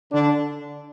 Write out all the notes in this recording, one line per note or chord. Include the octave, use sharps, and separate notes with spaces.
D3 D4